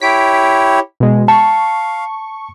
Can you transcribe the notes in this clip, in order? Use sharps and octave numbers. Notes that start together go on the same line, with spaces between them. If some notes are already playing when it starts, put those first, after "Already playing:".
E4 G4 C#5 B6 D7
B2 G#3
F5 A5 C#6